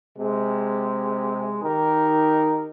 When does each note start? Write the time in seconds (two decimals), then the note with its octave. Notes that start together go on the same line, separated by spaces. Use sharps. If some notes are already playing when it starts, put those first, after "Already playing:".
0.17 C3 G#3
1.63 D#3 D#4 G4 A#4